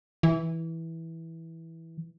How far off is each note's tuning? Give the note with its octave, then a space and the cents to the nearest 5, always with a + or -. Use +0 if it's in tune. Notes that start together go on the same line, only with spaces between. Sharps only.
E3 -10